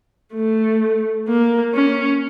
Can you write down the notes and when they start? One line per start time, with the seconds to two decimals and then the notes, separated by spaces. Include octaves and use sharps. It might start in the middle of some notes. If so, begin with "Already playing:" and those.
0.34 A3
1.28 A#3
1.74 C#4